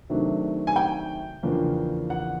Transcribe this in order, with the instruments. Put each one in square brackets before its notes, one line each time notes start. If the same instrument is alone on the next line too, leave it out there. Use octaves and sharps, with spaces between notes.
[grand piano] C3 D#3 F#3 A3 D4
[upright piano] G#5
G5
[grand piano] E2 C#3 F3 A#3 D4
[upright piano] F#5